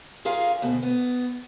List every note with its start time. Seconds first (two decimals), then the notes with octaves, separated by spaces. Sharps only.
0.25 C#4 F4 G#4 A#4 F5
0.62 D2 B2
0.82 B3